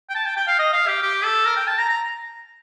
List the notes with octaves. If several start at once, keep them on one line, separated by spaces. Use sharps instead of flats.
G5
A5
G5
G5
F5
D#5
F5
G4
G4
A4
A#4
G5
A5
A#5
A#5